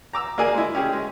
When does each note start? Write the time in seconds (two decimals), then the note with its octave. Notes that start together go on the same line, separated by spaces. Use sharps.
0.13 A#5 D6 E6
0.38 A#3 D4 G#4 A#4 G#5
0.54 G#3 E4
0.75 C#4 G4 G#4
0.93 G#3